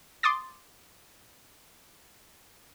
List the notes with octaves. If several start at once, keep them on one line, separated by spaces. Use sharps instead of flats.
C6 D6 D#6 A6